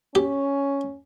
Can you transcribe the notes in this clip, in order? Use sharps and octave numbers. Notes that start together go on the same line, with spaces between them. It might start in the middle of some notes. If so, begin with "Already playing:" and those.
C#4 G4